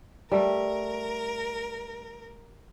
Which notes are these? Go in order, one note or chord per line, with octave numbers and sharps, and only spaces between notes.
G3 A3 A#4